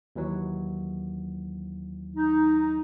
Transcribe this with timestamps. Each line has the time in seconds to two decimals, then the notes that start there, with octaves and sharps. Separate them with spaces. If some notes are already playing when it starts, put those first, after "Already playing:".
0.16 D#2 E3 F#3
2.16 D#4